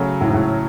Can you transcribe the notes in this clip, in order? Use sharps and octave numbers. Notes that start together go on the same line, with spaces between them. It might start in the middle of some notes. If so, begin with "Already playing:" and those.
Already playing: C#3 F#3 A3 C#4 F#4
A2
G#2
A2